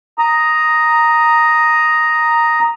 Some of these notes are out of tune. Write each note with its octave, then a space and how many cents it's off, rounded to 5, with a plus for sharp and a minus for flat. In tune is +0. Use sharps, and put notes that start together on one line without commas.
A#5 +0 D#6 +0